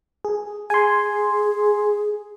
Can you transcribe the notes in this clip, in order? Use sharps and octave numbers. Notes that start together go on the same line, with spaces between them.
G#4
G#4 G#5 C6